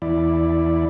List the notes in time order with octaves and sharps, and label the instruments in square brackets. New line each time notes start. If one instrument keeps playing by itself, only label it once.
[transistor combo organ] E2 E4 D5